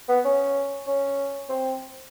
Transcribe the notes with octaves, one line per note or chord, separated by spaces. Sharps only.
B3
C#4
C#4
C4